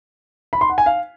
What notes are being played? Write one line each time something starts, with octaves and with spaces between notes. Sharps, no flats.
B5
C6
F#5
G#5
F5